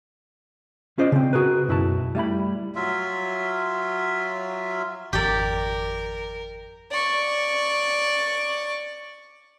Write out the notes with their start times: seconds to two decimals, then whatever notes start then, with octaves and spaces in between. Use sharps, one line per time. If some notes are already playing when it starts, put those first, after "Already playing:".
0.98 C#4 F4 G#4 C5 D5 D#5
1.12 C#3 C4
1.33 F#4 G#4 A#4 B4
1.68 B1 F#2 E4 F#4 A5
2.15 G3 A3 E4 B5
2.76 F#3 F4 E5
5.13 G#1 F2 G4 A#4 D5
6.91 D5 C#6